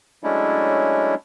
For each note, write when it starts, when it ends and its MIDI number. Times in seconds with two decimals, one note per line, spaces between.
0.23 1.15 54
0.23 1.15 56
0.23 1.15 57
0.23 1.15 61
0.23 1.15 62
0.23 1.15 64